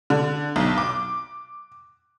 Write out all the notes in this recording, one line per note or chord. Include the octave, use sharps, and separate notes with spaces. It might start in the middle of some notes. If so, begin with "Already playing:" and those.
D3
B1
D6